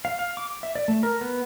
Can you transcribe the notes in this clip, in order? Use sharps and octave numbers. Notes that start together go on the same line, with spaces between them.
F5
F5
D6
E5
D5
A3
A#4
B3